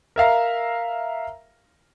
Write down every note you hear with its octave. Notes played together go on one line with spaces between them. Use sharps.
A#4 E5 F5 A#5